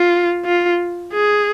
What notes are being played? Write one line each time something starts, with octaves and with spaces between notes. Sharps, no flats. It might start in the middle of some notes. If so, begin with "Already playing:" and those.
Already playing: F4
F4
G#4